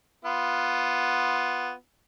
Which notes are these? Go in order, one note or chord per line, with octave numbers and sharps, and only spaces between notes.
B3 F4